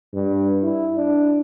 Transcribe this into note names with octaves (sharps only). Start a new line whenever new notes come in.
G2
E4
D4